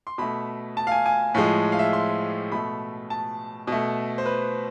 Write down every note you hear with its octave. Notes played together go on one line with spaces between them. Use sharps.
C6
B2 A3 B5
A5
F5
G#5
G#5
A2 F3 G#3
F5
E5
C6
B2 A3 B5
A5
B2 A3
C5
B4